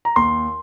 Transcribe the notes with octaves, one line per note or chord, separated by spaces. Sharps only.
A#5
D#2 C6